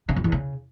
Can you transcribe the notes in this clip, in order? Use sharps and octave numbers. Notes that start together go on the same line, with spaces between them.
C#3
F2
E2
C#3